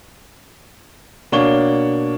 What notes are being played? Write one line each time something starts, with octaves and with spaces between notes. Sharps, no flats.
B2 A#3 D4 C#5 C#6 G7